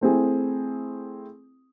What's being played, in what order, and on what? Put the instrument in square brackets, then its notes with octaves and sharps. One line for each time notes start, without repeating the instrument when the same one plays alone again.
[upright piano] A3 C4 E4 G#4